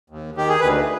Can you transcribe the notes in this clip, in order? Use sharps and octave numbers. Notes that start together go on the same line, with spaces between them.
D#2
D#3 G4
G#4
D2 B4